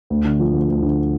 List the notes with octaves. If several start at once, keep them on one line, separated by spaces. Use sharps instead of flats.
D2
D3
F3
D2
D2
D3